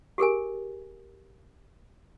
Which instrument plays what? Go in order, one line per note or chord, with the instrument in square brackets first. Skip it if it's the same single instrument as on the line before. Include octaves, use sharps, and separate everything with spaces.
[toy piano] G4 G#4 A#4 G#5